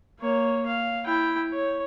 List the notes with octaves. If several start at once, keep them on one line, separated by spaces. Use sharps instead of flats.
A#3 C#5
F5
E4 G5
C#5